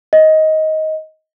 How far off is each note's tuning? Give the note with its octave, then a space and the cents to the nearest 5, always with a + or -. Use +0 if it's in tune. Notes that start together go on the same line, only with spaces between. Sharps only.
D#5 +15